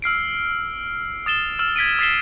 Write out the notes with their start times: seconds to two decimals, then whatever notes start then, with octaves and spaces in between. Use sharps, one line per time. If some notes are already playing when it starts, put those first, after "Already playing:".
0.02 E6 F6 C7 D7
1.26 D#6 A6 E7 G7
1.59 E6 F6 E7
1.76 G#6 B6 D7 D#7
1.99 D#6 A6 B6 C7 E7 G7